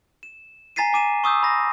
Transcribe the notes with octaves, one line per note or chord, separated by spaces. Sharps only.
E7
G#5 A#5 A6 B6 C7 D#7
G#5 D6 D#7 E7
C#6 D#6 E6 G6
B5 A#6